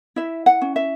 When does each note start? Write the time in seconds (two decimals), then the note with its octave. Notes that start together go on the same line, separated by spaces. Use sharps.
0.16 E4 E5
0.46 F#5
0.62 C#4
0.76 E5